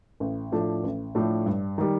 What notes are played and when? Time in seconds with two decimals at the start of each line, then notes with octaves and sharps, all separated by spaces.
0.20 A1
0.52 A2 F3 A3 D4
0.84 A1
1.15 A2 F3 A3 D4
1.46 G2
1.78 D#3 G3